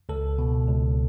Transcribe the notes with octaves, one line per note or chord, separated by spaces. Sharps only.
C#2 A4
B2
C#2